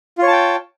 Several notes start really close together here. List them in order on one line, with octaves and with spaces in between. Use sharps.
F4 C#5 A5 G5